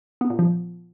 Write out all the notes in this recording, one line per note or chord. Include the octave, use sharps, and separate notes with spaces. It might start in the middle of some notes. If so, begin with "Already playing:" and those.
B3
A#2
F3